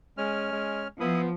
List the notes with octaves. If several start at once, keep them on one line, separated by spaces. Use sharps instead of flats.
G#3 C#4 F6
G#3
F3 B3 E4 B5 D#6